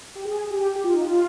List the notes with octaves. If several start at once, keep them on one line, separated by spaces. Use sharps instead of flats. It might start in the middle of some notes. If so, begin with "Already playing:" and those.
G4
G#4
G4
G4
F4
D#4
F4